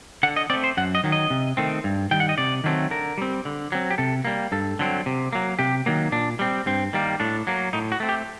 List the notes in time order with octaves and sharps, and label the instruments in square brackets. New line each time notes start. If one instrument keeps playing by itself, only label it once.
[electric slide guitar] D3 F#5
D#5
A3 C4 D5
C5
F#2 F#5
D#5
D#3 F#3
D#5
C3
D#3 A3 C4
G2
D#3 G3 G5
F#5
D#5
C3 D5
D#3 F#3 A3 C4
D3 A#4
G3 C4
D3
F#3 C4
G4
C3 A4
G3 A#3
G2 A4
D3 F#3 C4
C3
F#3 A#3
C3 G4
D#3 F#3 A#3
A#2 D4
G3 C4
G2 C4
D#3 G3 A#3
A2 D4
F#3 A#3
A2 D#4
F#4
A3 C4
G4